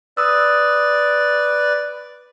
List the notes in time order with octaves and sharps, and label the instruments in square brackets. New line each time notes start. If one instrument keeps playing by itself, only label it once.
[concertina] B4 D5 [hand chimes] D#6 E6